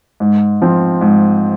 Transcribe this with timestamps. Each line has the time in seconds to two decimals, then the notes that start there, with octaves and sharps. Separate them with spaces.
0.20 G#2
0.62 F3 C4
1.01 G#2